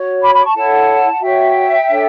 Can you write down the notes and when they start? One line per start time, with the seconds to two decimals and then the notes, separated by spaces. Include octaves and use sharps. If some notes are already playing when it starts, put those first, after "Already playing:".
Already playing: F#4 C#5
0.22 B5 D6
0.33 B5 D6
0.44 A5 C#6
0.55 E4 A4 C#5 F#5 A5
1.11 F#5
1.21 F#4 C#5 E5 G5
1.88 D4 A4 C#5